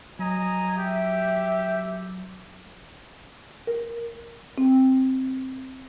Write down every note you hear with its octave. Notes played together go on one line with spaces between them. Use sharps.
F#3 D#5 G#5 A#5
G4 E5
A#4
C4